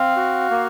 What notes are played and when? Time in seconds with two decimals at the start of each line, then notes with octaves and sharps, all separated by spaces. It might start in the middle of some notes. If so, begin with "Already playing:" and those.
Already playing: C4 F5
0.16 F#4
0.51 A#3